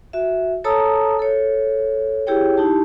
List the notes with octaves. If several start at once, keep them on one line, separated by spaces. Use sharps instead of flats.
F#4 E5
A4 C#5 A5 A#5 D#6 E6
A4 C#5
E4 G4 G#4 C#5 G5
D#4 E4 G4 A5